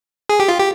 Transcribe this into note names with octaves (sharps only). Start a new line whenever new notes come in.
G#4
G4
F4
G4